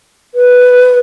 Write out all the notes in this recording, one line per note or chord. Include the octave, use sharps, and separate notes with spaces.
B4